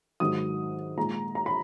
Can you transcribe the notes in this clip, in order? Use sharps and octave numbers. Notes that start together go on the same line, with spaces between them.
G#2 D#3 F#3 D#6
A#2 G#3 A#5
A#5
B5